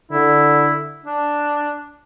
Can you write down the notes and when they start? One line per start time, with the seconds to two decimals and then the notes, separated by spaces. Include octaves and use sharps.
0.11 D3 E4
1.06 D4